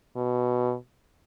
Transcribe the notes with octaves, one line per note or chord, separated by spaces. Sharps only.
B2